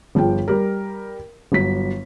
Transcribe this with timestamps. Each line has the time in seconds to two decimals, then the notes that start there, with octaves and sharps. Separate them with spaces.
0.15 G1 F3 G#4 G5
0.48 G3 G4 A#4
1.52 G1 F#3 B6